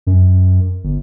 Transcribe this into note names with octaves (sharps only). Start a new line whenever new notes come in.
F#2
G1